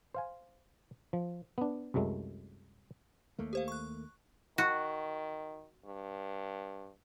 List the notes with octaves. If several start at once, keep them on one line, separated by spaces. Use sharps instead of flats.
C5 F5 G#5
F3
B3 D4
C2 F#2 F#3 G#3 A3
D#2 A3 A#3
G4 C5 F5
C#6 F#6
D#3 F#4
G2